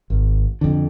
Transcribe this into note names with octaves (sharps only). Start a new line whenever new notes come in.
G#1
F2 D3